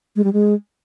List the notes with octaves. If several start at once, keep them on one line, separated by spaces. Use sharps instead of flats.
G#3
G3
G#3